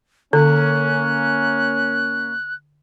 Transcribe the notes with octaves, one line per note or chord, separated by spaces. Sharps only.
D3 A#3 C#4 F#6